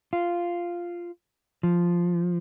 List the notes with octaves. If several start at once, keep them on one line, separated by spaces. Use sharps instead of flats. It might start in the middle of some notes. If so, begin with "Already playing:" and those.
F4
F3